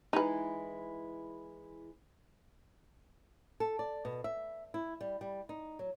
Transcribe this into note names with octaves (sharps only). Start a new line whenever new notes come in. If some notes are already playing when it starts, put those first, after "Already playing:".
E3 G#3 D#4 E4 B4
A4
D5
B2
E5
E4
G3
G3
D#4
F#3